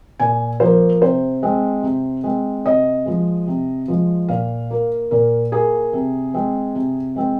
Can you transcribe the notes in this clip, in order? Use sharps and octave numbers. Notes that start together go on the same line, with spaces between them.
A#2 G#5
F3 A#3 C5
C3 C5
G#3 C4
C3
G#3 C4
C3 D#5
F3 G#3
C3
F3 G#3
A#2 F5
A#3
A#2 A#4
A#3 G#4
C3
G#3 C4
C3
G#3 C4